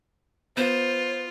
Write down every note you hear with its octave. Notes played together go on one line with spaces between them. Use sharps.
B3 F4 C5